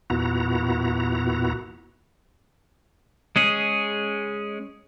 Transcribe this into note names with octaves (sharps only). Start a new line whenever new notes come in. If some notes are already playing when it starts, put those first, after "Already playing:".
E2 A#2 B3 E4 F#4 A#5
G#3 C#4 G#4